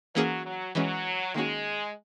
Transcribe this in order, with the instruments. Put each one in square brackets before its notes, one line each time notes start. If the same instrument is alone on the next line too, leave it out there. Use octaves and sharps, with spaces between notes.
[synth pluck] E3 A#3 C#4 G#4 [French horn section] F#3
[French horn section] F#3
[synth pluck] E3 G#3 C#4 [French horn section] F#3
[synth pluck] D#3 A#3 C#4 F#4 [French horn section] G#3